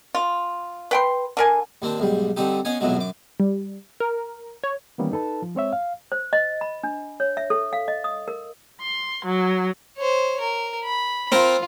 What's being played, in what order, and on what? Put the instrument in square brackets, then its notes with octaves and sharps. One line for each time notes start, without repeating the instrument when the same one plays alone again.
[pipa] F4
B4 G5 C6
D3 A#4 G#5
[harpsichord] D#2 A#3 C4 D4
B1 G#2 G3
D3 G3 C4 D#4 G4
B3 C#4 D#5 F5 G#5
B1 F2 B2 E3 F#3 G#3
F#2 D6
[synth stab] G3
A#4
C#5
[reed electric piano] D#3 E3 G3 A#3 B3 C#4
D#4 A4 B4 A5
F3
G#3 C4 C#5 E5
F5
[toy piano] C5
D#5
B5
D4
C#5
E5
A4
F5
D#5
D#6
A#4
[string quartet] C6
F#3
[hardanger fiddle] C5 C#5
A#4
B5
[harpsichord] C4 A#4 [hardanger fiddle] F4